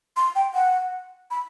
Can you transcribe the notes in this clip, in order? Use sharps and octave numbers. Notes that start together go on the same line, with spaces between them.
C6
G5
F#5
B5